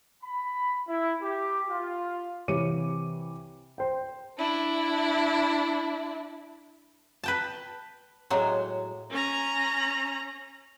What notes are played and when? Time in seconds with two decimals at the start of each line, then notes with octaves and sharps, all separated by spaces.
0.23 B5
0.88 E4
1.22 G4
1.69 F4
2.48 C3 E3 C#5 D6 C#7 D#7
3.78 C5 G5
4.38 D4 E4
7.24 B4 G5 A5
8.30 A2 F#3 G#3
9.11 C#4 A#5